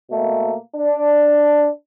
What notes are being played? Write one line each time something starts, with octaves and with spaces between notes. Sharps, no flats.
B2 A3 A#3
D4